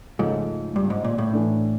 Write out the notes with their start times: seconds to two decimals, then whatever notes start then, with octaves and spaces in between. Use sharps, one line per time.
0.19 G#2 C#3 F3 A3 C#4
0.76 G2
0.90 G#2
1.04 A#2
1.18 A2
1.33 E3 A3 D4